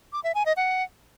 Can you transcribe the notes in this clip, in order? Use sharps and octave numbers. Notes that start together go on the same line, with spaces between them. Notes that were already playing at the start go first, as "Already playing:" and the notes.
D6
E5
G#5
D#5
F#5